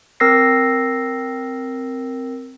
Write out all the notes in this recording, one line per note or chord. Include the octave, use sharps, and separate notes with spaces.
C4 A#4 E6 A#6 C7